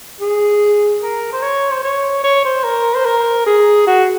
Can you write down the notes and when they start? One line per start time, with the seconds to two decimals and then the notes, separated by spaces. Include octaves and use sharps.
0.21 G#4
1.02 A#4
1.33 C5
1.42 C#5
1.71 C5
1.83 C#5
2.24 C#5
2.44 C5
2.64 A#4
2.96 C5
3.06 A#4
3.46 G#4
3.87 F#4